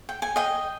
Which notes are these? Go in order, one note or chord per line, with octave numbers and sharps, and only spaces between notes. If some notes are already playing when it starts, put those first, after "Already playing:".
G5
G#5
D#5 G5